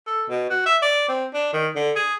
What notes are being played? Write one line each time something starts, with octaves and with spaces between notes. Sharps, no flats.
A4
B2
F#4
E5
D5
C4
D4
D#3
D3
G#4